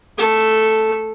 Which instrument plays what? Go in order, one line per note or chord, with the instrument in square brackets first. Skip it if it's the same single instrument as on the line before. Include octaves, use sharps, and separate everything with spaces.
[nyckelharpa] A3 A4